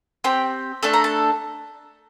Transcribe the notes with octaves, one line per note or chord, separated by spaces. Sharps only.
C4 G4 G5
A3 D4 A4 A5
A#5
A5